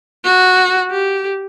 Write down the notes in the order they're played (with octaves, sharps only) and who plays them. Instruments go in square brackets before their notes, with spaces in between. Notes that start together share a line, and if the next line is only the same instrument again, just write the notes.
[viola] F#4
G4